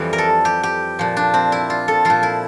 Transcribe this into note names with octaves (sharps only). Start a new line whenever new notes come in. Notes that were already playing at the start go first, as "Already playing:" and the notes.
Already playing: F2 E3 G3
A#4
A4
G4
G4
A#2 F3
D4
C4
E4
F4
A4
A#2 F3 F4
E4